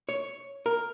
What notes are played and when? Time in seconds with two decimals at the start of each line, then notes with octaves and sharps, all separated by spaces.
0.09 C#5
0.66 A#4